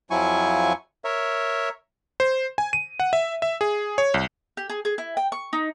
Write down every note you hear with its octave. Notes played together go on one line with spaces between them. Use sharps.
F2 F3 F#3 E4 G#5 C#6
A#4 C#5 E5
C5
G#5
D#7
F#5
E5
E5
G#4
C#5
C2
G4
G#4
G#4
E4
G5
C#6
D#4